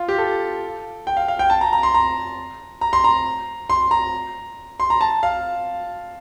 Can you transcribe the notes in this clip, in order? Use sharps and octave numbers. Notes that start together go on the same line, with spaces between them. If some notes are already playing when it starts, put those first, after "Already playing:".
Already playing: F4
G4
A4
G5
F5
F5
G5
A5
A#5
A#5
C6
A#5
A#5
C6
A#5
C6
A#5
C6
A#5
A5
F5